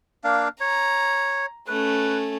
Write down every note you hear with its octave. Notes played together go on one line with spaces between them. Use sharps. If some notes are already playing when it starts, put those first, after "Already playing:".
A#3 D4 F5
C#5 A#5
A3 C#4 B4